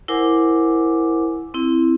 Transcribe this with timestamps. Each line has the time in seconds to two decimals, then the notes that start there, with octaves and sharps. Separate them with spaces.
0.08 E4 A#4 C5 F#5 G#5 D6
1.54 C4 E4